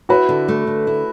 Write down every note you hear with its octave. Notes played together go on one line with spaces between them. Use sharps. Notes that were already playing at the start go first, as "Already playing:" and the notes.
E4 F#4 B4
D3
A3
D3
E4